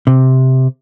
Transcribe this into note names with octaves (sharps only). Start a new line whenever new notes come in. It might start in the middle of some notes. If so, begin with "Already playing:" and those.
C3